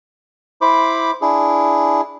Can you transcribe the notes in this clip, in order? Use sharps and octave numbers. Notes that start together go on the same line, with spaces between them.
E4 C5 B5 D6
D4 E4 G#4